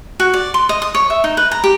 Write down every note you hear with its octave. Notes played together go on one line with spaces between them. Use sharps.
F#4
D5
C6
D#5
D#6
C#5
E5
D#4
B4
A#5
G4